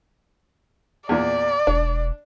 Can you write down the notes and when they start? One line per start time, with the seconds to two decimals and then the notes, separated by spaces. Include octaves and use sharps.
1.09 E2 A#2 D5
1.67 E1 D4